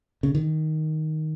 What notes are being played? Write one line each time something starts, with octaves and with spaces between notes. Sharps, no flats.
C#3
D#3